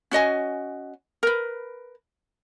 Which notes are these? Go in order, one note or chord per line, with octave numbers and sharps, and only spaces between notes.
C#4 F#4 D#5 G#5
A#4 B4